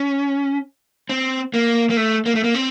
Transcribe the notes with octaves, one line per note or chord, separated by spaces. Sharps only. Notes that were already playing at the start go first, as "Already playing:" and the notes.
Already playing: C#4
C4
A#3
A#3
A3
A#3
A3
A#3
C4